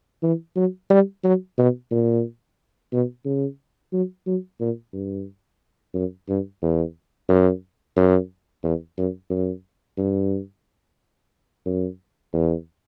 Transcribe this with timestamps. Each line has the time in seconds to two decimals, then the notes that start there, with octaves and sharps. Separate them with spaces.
0.23 E3
0.56 F#3
0.90 G3
1.24 F#3
1.58 B2
1.91 A#2
2.93 B2
3.25 C#3
3.93 F#3
4.27 F#3
4.60 A#2
4.93 G2
5.94 F#2
6.29 G2
6.62 E2
7.29 F#2
7.96 F#2
8.63 E2
8.98 F#2
9.30 F#2
9.98 G2
11.66 F#2
12.33 E2